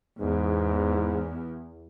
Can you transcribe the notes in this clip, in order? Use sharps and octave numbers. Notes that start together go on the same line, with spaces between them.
E2 G#2